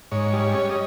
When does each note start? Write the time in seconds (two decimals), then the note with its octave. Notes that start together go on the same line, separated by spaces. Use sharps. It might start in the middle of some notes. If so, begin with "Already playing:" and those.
0.12 G#2 C#5
0.33 G3
0.40 C#5
0.54 C#4
0.70 D#5